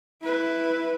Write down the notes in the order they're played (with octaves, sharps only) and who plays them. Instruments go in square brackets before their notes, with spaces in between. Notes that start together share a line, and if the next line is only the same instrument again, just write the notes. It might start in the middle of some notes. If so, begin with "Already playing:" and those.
[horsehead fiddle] E4 B4